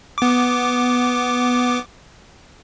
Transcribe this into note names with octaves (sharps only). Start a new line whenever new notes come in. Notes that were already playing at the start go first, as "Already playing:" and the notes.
B3 D6